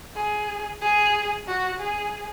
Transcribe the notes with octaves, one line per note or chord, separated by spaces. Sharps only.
G#4
G#4
F#4
G#4